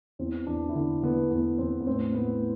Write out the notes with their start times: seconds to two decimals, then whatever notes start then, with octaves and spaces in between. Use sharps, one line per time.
0.19 E2 C4
0.47 E2 D4
0.69 E4
0.75 D3 D4
1.03 D3 B3
1.31 E2 B3
1.59 E2 C4
1.81 B3
1.86 A2 C4
2.14 A2 B3